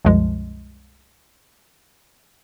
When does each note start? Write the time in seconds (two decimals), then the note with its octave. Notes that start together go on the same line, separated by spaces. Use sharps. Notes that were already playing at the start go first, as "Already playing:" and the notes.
0.05 C2 F#2 B2 F3 G#3